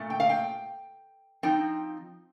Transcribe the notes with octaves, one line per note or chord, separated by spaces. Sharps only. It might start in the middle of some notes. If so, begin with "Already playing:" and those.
Already playing: A#2 A3
G5
F5
G5
F3 C4 D#4 G5